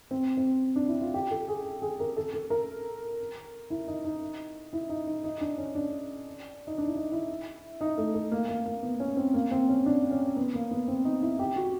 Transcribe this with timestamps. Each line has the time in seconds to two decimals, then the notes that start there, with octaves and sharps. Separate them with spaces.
0.11 C4
0.37 C4
0.76 D4
0.88 E4
1.01 F4
1.14 G4
1.31 A4
1.48 G#4
1.82 G#4
2.00 A#4
2.17 A4
2.34 A4
2.50 A#4
3.70 E4
3.88 D#4
4.05 D#4
4.73 E4
4.89 D#4
5.07 D#4
5.24 D#4
5.41 D4
5.58 C#4
5.75 D4
6.67 D#4
6.78 D4
6.88 E4
6.95 D#4
7.12 E4
7.81 D#4
7.98 A3
8.14 A3
8.32 A#3
8.49 A#3
8.66 A#3
8.83 B3
9.00 C#4
9.17 C4
9.34 A#3
9.51 C4
9.69 C#4
9.86 D4
10.11 C#4
10.36 B3
10.54 A#3
10.71 B3
10.88 C4
11.05 D#4
11.22 E4
11.39 G4
11.56 F#4